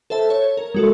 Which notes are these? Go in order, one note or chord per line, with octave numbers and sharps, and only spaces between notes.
A4 C5 E5 A5
C#5
A#4
G#3 F#4 A4